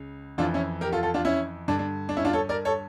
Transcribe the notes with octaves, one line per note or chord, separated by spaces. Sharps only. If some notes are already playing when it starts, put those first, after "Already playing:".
Already playing: C#2 C#3
F2 E3 D4 F4
C#4 E4
G4 A#4
F4 A4
F4 A4
D4 F4
C#4 E4
G2 D3 D4
D4
D4
C#4 E4
D4 F4
A4 C#5
A#4 D5
A4 C#5